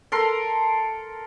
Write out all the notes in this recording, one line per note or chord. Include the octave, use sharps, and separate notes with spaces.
A4 A#4 C6